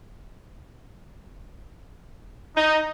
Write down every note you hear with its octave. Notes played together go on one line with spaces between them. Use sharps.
D#4